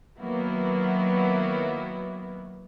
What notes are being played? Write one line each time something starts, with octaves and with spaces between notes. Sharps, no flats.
D#3 F#3 A#3 B3 E4 F#4